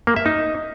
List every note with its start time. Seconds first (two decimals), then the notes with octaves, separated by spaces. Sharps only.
0.07 A#3
0.16 E5
0.26 D#4